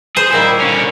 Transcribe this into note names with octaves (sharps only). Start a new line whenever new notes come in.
G#4 C5
A#2 D#3 G3 E4
D3 C#4